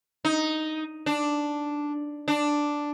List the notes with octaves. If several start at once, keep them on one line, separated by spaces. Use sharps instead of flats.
D#4
D4
D4